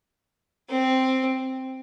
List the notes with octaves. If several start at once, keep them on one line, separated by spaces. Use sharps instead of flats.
C4